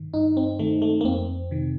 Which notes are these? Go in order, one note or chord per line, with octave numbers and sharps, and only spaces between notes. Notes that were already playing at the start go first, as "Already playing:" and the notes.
Already playing: G2 D#3
G2 D#4
C4
D#3 A3
A3
A#3
F2 C4
C3 D#3